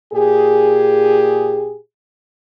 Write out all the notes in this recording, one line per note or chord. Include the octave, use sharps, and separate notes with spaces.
A#2 G4 G#4